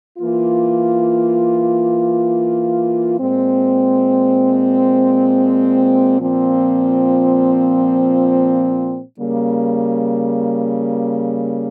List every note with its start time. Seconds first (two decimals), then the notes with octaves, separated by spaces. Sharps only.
0.18 E3 A#3 F4
3.18 A#2 G#3 C4
6.18 A#2 F3 C4
9.18 C#3 G3 A#3